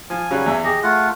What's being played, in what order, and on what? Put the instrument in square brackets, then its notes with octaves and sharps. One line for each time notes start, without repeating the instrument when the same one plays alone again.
[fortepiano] F3 [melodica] G#5
[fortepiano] C#3 F#3 G3
E2 E5
[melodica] G4 D#5 [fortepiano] G#4
[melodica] A3 F4 F#5